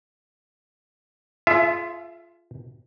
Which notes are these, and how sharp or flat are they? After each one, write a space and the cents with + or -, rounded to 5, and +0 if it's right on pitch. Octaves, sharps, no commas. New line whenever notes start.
F4 -15 G#4 +40 E5 +20